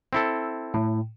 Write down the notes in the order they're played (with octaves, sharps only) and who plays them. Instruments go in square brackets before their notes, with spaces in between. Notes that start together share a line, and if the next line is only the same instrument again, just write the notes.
[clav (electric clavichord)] C4 E4 A4
[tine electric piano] A2